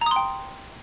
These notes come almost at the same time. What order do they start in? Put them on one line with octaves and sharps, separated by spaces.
A#5 D#6 C6 G5